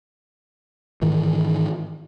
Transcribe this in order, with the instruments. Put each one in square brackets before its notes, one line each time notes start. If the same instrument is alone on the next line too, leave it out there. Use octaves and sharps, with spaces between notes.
[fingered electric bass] G#2 D#3 E3